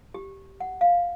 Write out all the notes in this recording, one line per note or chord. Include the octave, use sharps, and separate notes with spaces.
G4
F#5
F5